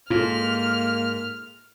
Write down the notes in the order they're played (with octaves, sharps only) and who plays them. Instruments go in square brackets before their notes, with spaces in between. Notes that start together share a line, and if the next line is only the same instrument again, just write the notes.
[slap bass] G#2 [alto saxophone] A#3 [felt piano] F4 A4 [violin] F6